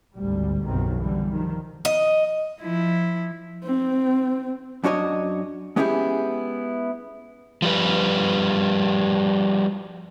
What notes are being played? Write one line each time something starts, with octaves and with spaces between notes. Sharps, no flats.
G#1 D2 G3
F#1 B1 F#2 C3 D#3 C4
D3 E3 G3
D#3 F3
D#5
F3 E4
C4
F#2 D4 F#4 C#5 D#5
G#3 B3 C#4 E4 G4 G#4
F3 G3 B4